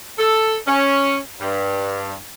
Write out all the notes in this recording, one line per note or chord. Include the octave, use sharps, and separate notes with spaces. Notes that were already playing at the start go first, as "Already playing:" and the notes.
A4
C#4
G2